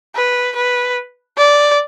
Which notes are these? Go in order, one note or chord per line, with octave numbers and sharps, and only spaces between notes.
B4
B4
D5